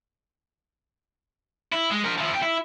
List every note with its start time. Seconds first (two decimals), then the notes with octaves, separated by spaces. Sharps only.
1.72 E4
1.91 G#3
2.04 F3 A#4
2.18 F3 E4
2.31 F2 G5
2.43 E4